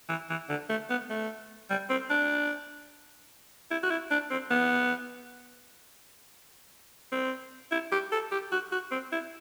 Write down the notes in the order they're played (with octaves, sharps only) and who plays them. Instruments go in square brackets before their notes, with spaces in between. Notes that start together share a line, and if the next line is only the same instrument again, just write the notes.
[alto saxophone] E3
E3
D3
A3
B3
A3
G3
C4
D4
E4
F#4
E4
D4
C4
B3
C4
E4
G4
A4
G4
F#4
F#4
C4
E4